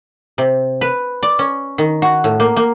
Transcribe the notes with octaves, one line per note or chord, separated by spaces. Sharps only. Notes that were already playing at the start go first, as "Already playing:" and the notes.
C3
B4
D5
C#4
D#3
F#4
A2
A#3
A#3